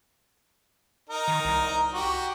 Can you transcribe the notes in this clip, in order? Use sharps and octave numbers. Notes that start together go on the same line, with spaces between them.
D#4 A#4
D#3
C2
F#4 G4